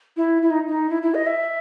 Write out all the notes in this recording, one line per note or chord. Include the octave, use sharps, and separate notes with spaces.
E4
E4
D#4
D#4
E4
E4
D#5
E5